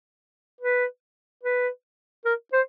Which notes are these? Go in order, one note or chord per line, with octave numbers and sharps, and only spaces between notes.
B4
B4
A#4
C5